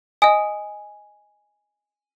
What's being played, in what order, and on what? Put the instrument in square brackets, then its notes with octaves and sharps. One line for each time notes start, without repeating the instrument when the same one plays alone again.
[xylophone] D#5 D#6 [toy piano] G#5